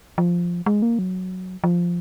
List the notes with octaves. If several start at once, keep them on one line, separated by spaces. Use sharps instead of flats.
F3
G#3
A#3
F#3
F3